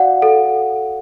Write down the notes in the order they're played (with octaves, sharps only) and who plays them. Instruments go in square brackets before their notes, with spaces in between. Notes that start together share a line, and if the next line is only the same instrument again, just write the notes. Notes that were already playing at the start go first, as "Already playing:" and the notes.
Already playing: [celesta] F#4 D5 F5 F#5
A4